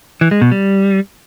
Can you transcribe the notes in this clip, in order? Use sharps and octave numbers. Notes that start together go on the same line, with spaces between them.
E3
G#3
B2
G3